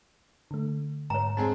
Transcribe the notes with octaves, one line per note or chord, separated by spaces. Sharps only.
D3 A3
G#2 C#5 A#5
G#3 C4 G#4 A5